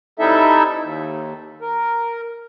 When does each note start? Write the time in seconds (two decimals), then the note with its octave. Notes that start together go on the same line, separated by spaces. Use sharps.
0.19 G3 C4 D#4 E4 A4 E5
0.80 D#2
1.62 A#4